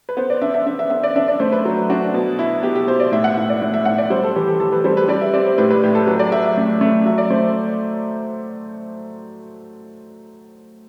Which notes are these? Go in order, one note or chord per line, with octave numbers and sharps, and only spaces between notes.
B4
B3 C5
D5
D4 E5
E5
D4 E5
E5
B3 E5
D5
D4 E5
D5
A3 C5
B4
F#3
D4 F#4
B2
E4
B2 G4
G4
B2 C5
D5
A2 E5
F#5
A2 E5
D5
A2 E5
E5
A2 F#5
D5
G3 C5
A4
E3 G4
G4
E3 A4
B4
G3 C5
B4
G3 D5
E5
C4 D5
C5
A2 B4
B4
A2 G4
A4
F#3 B4
D5
F#3 E5
E5
A3
A3
F#3 E5
D5
A3 C5